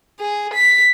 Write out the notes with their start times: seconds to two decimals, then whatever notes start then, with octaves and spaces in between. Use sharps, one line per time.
0.20 G#4
0.54 B6